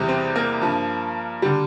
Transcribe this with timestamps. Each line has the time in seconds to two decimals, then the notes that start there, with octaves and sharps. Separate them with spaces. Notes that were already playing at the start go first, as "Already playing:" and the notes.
Already playing: E2 C3 G3
0.09 C4
0.36 A#3
0.62 G2 F3
1.42 D3 G3